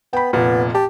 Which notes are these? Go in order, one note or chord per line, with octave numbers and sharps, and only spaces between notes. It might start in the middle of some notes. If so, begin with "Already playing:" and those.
B3 G5 B5
F1 A#2 B3
G4 A5